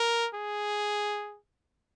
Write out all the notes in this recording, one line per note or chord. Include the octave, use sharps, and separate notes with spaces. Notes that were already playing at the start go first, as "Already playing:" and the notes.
Already playing: A#4
G#4